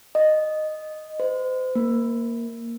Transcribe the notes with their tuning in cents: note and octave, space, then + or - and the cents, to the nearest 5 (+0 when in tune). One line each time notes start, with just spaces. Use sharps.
D#5 -10
C5 -35
A#3 +0